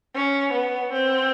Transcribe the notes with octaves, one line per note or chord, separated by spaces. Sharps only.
C#4
B3
C4